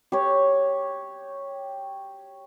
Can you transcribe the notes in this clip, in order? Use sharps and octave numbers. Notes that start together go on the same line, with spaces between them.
G4 C#5